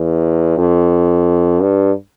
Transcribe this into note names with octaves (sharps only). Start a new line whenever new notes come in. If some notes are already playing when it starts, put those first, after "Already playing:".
Already playing: E2
F2
G2